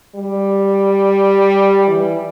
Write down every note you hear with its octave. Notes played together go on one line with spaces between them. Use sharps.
G3
E3